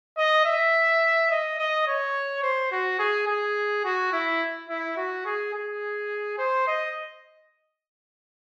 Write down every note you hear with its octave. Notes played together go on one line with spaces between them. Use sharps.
D#5
E5
D#5
D#5
C#5
C5
F#4
G#4
G#4
F#4
E4
E4
F#4
G#4
G#4
C5
D#5